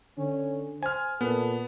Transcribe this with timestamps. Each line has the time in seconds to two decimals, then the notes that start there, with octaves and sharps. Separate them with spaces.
0.18 D3 C#4
0.83 C5 G#5 F6
1.21 A#2 B3 A4